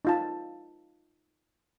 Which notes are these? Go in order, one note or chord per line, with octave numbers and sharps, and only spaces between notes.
D#4 F4 A5